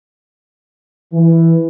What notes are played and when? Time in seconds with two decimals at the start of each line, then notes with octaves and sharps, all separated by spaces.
1.13 E3